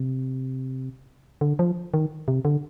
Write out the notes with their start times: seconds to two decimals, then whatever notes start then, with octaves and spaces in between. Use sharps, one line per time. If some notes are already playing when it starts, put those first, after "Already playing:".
Already playing: C3
1.41 D3
1.59 F3
1.94 D#3
2.28 C3
2.45 D3